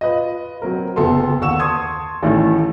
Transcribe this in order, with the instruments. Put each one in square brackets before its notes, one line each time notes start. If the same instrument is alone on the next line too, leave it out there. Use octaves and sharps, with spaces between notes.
[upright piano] F4 B4 D#5
F#3 C4 A#4
F#1 B3 A4 C6
D#2 F#5 C#6 E6 E7
A5 C6 C#6 D#6 G#6
A1 D#3 A3 E4